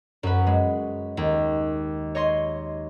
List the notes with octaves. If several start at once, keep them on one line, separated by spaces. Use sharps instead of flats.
F#2 B4
G#3
D#2
C#5 D#5 C6